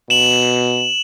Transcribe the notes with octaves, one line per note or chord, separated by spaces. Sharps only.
B2 E7 F#7